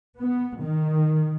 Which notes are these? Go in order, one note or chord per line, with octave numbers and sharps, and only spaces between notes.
B3
D#3